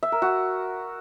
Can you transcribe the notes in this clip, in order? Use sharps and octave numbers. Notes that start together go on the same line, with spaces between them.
E5
A#4
F#4